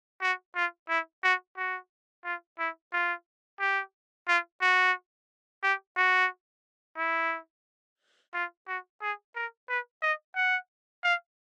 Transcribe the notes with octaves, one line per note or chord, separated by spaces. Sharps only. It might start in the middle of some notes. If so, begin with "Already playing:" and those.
F#4
F4
E4
F#4
F#4
F4
E4
F4
G4
F4
F#4
G4
F#4
E4
F4
F#4
G#4
A#4
B4
D#5
F#5
F5